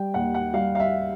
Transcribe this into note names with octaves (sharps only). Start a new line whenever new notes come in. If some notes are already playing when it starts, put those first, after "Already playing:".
Already playing: G3 G5
D#2 F#5
F#5
G3 F5
F5
E5